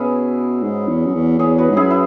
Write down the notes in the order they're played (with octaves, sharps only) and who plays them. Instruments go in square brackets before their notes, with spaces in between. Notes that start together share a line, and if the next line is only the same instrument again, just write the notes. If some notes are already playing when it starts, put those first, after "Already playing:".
Already playing: [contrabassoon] B2 [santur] C#4 E4 F#4 G#4 B4
[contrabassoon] G#2
E2
F#2
E2
[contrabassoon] E2 [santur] G#4 C#5
[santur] F#4 B4
[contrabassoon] G#2
[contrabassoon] F#2 [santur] E4 G#4
[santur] E4